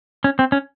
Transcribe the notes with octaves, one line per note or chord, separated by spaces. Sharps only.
C#4
C4
C#4